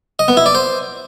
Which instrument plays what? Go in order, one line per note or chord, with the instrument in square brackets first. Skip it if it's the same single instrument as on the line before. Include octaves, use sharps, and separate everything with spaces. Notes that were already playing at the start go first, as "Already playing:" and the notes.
[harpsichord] D#5
B3
E4
D5
C5